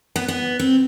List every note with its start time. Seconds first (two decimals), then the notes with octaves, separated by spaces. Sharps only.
0.16 B3
0.28 B3
0.59 C4